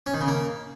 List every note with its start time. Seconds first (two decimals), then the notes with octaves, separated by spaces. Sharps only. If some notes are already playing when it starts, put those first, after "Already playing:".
0.06 C#4
0.14 D#3
0.21 C#3
0.28 A#3